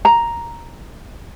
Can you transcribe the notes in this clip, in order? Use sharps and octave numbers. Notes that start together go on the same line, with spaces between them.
A#5